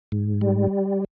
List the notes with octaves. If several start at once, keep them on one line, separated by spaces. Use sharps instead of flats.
G#2
G3